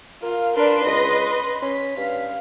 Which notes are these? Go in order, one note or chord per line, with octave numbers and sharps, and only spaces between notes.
F4 A#4 F5
D4 A#4 B4 C6
C#2 D#5
C#4 B6
G2 F5